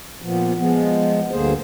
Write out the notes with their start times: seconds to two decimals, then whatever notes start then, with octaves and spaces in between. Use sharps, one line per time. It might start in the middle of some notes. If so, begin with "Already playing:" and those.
0.22 A#2 F3 B3
0.58 F3 G#3 B3
1.31 D2 G2 D3 A#3 G#4 C5